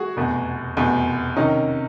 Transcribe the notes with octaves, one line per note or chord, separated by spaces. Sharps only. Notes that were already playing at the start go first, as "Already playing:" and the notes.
Already playing: F#4 G#4
F1 E2 B2
F1 E2 B2
C3 D#3 C#4 D#4